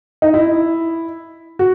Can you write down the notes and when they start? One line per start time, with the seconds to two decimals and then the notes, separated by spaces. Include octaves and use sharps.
0.22 D#4
0.34 E4
1.59 F#4